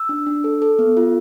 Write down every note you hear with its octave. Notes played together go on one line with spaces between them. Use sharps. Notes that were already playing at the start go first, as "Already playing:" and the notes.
Already playing: E6
D4
D4
A4
A4
B3
F4